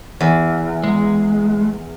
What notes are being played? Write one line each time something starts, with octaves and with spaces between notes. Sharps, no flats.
E2
G#3